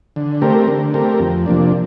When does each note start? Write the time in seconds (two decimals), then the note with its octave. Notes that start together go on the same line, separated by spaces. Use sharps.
0.16 D3
0.42 A3 C4 G4 A#4
0.68 D3
0.94 A3 C4 G4 A#4
1.20 F2
1.46 C3 F3 A#3 D4